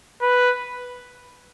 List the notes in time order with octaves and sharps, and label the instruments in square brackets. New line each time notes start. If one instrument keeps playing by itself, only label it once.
[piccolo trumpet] B4